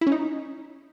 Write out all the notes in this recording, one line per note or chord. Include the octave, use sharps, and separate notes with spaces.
E4
C#4
D#4